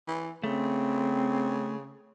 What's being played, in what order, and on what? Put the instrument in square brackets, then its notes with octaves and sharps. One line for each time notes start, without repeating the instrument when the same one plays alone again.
[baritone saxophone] E3
[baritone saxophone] C#3 [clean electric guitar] A3 [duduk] C4